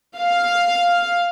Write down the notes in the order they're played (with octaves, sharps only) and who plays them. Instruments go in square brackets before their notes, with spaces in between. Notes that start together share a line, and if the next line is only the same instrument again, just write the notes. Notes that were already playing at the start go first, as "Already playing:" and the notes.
[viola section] F5